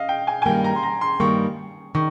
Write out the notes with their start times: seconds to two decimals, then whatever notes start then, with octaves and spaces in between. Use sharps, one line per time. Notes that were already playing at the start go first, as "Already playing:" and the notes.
Already playing: D#5 F5
0.09 G5
0.27 G#5
0.42 G#5
0.46 G2 D#3 G3 A#3 G5
0.64 A#5
0.76 C6
0.83 A#5
1.01 C6
1.20 G2 D#3 G3 A#3 C#6
1.95 D#3 C#6